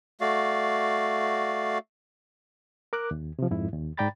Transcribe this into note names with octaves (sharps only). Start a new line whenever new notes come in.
A3 F#4 D5 F5
A#4 D6 F#6
D#2
C3 F3
F2 G#2 E4
D#2
G#2 D5 G5 A#5 B5 A6